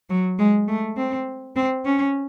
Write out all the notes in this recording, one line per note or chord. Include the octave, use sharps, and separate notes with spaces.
F#3
G#3
A3
C4
C4
C#4